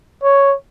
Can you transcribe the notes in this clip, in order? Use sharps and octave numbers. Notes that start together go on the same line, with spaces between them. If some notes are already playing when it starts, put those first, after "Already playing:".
C#5